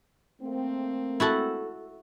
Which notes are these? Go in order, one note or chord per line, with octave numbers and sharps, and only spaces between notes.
A3 A#3 C4
E4 F#4 A4